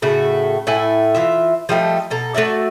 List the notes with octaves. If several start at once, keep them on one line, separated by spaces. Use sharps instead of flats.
A2 C#3 A3 F#4
A2 A3 E4 G#5
E3 F#3 F4 E5
F3 G3 A3 D#4
B2 A4 A#5
A3 F#4 D5 E5